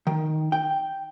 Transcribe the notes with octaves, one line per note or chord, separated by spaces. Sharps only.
D#3
G5